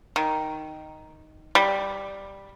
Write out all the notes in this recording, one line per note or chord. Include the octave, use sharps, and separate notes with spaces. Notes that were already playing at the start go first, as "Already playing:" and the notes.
D#3
G3